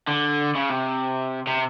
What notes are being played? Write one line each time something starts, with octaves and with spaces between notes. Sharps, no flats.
D3
C#3
C3
C3